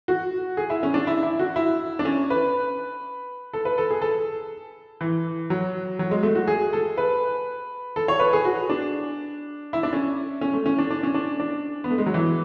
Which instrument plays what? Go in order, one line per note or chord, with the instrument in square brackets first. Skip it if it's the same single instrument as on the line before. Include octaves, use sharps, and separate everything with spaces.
[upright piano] F#4
G#4
E4
C#4
D4
E4
E4
F#4
E4
D4
C#4
B4
A4
B4
A4
G#4
A4
E3
F#3
F#3
G#3
A3
F#4
G#4
A4
B4
A4
C#5
B4
G#4
F#4
D4
E4
D4
C#4
C#4
A3
C#4
D4
D4
C#4
D4
D4
B3
A3
G#3
F#3
E3